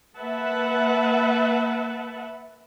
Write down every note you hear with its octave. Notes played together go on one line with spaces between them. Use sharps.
A#3 B4 E5 F#5 A5